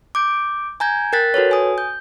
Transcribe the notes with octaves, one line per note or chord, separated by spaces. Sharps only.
D6 G6 D7
G#5 A#5 G6 G#6
A#4 G5 F#6 A6 B6
F#4 A4 B4 C#5
G#5 D#6
G6